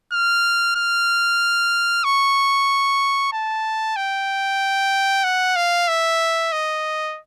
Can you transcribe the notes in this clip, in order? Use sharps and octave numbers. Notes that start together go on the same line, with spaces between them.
F6
F6
C#6
A5
G5
F#5
F5
E5
D#5